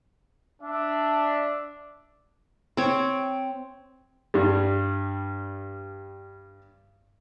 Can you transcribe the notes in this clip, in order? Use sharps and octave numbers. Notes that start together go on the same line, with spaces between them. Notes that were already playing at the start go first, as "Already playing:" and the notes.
D4 E5
C4 C#5
G2 G3